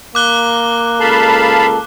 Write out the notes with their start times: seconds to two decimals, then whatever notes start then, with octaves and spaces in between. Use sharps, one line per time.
0.15 A#3 D6 F#6 G7
1.00 C#2 A4 F5 A5 B5